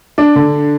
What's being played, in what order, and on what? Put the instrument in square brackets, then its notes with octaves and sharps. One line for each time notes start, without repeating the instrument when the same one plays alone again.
[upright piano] D4
D3